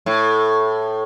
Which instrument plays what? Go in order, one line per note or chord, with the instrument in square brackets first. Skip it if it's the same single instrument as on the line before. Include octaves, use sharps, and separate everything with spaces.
[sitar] A2